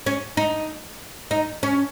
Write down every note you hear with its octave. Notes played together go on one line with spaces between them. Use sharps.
C#4
D#4
D#4
C#4